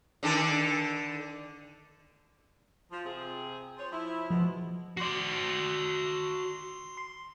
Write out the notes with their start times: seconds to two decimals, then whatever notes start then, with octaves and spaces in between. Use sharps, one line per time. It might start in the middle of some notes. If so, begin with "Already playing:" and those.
0.23 D3 D#3 A4
2.91 F3
3.04 C3 C4 G#4
3.78 F4 C5 C#5
3.92 F3 E4
4.30 B2 F3 G#3 B3
4.97 F#4 D5 C6 C7